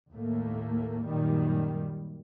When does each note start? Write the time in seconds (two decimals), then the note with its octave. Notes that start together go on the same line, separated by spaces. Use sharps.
0.12 D#2 A2 A3 A#3
1.05 F#2 A#2 D#3 G3